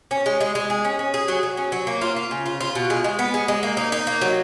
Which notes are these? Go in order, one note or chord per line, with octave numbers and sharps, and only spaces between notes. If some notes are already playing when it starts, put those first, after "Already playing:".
C#4
G#3
G#3
G#3
G#4
C#4
C#4
G#4
F#3
F#3
C#4
F#3
A#3
F4
F4
C#3
F4
F4
B2
G#3
G#3
B3
G#3
G#3
A#3
D#4
D#4
A#3
F#3